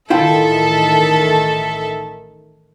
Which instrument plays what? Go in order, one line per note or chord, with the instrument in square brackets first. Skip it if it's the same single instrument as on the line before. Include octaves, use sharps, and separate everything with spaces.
[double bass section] A1 D#3 [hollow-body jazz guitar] E4 F4 G5 [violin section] A4 E5